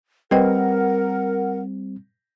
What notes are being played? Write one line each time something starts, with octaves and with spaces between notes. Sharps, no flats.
G3 C4 A#4 B4 D#5 F#5 G5